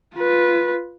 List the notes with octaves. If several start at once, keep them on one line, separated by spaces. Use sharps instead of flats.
F4 B4